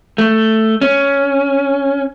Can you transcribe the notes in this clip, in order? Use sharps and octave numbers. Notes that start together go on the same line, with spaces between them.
A3
C#4